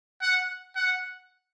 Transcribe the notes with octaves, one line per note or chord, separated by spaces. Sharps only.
F#5
F#5